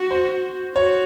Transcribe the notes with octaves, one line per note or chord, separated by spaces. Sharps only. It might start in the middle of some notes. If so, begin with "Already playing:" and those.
Already playing: F#4
C5
F#4 C#5